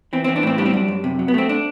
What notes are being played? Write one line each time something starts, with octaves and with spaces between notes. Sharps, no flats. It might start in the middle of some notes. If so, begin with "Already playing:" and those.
E3 C4
E3 C4
D4
A2 C4
G3 D4
C4
F#2 D4
F#2
C3
F#3
B3
A3 C4
D4